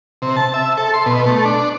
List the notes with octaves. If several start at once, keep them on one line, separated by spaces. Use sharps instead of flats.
C3
A5
E5
A4
C6
B2
A3
D4